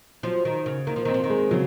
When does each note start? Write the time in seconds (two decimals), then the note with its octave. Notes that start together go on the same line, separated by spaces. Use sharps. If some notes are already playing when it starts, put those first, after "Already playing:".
0.23 F3 F#3
0.45 D#3
0.66 C#3
0.87 D#3 A#3
0.96 F3
1.05 D#3 C4
1.14 F3
1.24 D#3
1.30 G#3
1.51 C#3 F#3